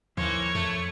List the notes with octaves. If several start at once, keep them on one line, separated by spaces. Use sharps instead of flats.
D#2 E3 F3 A#3 C#5 C6
F2 A3